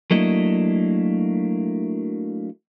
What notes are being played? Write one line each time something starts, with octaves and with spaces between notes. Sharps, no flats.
F#3 A3 A#3 D4 E4 D#5